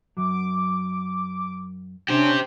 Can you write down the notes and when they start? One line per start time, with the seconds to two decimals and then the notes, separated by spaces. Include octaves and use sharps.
0.17 F#2 F#3 D6
2.09 C#4 D4 G4 C5